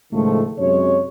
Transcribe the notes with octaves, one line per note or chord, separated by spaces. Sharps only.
C#2 A2 D#3 F3 G#3 A3
F#2 C3 F#3 G#3 C#5